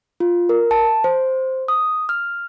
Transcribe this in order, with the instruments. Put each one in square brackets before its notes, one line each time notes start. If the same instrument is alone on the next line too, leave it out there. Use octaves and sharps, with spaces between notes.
[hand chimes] F4
A#4
A5
C5
D#6
F6